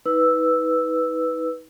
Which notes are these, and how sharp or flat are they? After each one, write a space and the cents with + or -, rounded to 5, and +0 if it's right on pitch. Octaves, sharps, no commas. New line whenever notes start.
D#4 +35 B4 +0 E6 +0